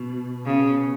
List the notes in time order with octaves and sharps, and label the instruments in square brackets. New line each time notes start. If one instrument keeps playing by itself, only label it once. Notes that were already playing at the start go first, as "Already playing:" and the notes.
Already playing: [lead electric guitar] B2
[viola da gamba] C#3